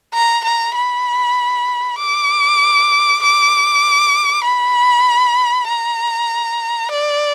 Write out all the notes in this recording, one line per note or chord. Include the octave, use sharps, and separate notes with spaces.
A#5
A#5
B5
D6
D6
B5
A#5
D5